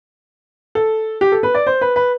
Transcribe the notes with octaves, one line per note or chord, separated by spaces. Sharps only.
A4
G4
A4
B4
D5
C5
B4
B4